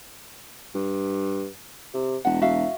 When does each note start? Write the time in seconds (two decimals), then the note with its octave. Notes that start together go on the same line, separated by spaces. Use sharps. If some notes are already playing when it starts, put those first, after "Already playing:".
0.75 G2
1.93 C3
2.25 E1 F#5
2.41 F#4 E5 F5